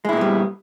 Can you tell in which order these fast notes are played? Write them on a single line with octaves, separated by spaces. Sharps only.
G#3 E4 A#2 B3 G3